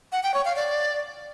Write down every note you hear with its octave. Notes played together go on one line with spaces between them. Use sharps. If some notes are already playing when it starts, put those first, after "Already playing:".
F#5
G5
C#5
F5
D5